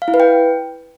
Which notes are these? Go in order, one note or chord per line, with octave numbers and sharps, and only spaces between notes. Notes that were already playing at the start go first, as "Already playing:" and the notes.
F5
E4
B4
G5